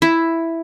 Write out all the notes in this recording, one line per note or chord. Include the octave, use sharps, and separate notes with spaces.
E4